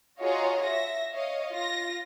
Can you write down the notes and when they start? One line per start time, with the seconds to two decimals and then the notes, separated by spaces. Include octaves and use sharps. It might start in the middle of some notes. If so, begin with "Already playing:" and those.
0.20 F4 F#4 G#4 C#5 D#5 A#5
0.64 E5 A#6
1.14 C#5 D#5 F5
1.51 F4 A#6